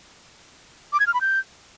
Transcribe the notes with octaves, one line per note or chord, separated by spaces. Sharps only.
D6
G#6
F6
B5
G6